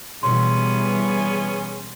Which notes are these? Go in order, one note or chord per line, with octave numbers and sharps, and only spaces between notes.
B2 E3 G3 B3 C#4 G#4 C6